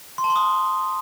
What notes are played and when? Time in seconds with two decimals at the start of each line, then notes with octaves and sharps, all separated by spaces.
0.18 C6
0.24 A5
0.30 C6
0.36 D#6